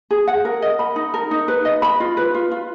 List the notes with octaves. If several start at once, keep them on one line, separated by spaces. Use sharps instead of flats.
G#4
F#5
A#4
D#5
B5
D#4
A#4
D#4
B4
D#5
B5
F4
B4
F4
F4